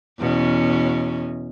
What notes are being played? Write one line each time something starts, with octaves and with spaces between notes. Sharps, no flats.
E2 B2 C#4